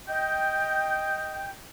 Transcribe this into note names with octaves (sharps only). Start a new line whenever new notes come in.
D#5 G5